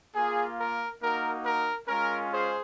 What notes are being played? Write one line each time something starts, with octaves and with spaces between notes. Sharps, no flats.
A#3 F4 G#4
A#4
A#3 D#4 F#4 A#4
A#4
G#3 C#4 F4 A#4
G#4 C5